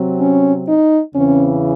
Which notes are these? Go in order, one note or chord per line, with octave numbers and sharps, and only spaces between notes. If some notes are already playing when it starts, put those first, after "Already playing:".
Already playing: C3 F#3 C4
C#4
D#4
E2 C#3 E3 C4 C#4